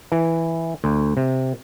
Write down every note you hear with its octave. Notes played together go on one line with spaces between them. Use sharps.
E3
D2
C3